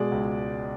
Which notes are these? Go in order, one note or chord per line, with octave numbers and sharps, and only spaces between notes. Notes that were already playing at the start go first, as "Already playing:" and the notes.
Already playing: B2 G#3 D5
C#2